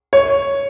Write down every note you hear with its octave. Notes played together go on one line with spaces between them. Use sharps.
C#5